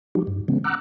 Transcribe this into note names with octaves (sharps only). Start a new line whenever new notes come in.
F3 G3 D#4 F#4 G4
G2
C#3 E3 G#3 B3 C#4
F#5 A#5 D6 E6 F#6